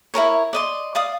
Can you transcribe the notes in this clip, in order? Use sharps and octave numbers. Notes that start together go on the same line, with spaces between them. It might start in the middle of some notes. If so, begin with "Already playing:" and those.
E4 G#4 A#4 C#5
D5 D#5 C6
D5 F5 D#6